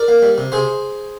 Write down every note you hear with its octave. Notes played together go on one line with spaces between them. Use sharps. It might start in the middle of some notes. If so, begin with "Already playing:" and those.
Already playing: A#4 D5
A#3
G3
C3
C3 G#4 C5